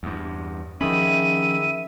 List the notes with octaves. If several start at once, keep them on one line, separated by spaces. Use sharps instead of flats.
E2 G2
D#3 F3 C#4 G#4 E5 B5 D#7